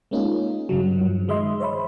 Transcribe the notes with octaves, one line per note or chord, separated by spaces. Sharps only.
G#3 A#3 C#4 D#4 F4 G#4
G2 C#3 F#3
G2 F3 F#3
D#3 G#3 D#5 E5 C6
C5 C#5 E5 B5